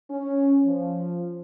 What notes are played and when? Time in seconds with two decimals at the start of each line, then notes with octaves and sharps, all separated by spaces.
0.10 C#4
0.64 F3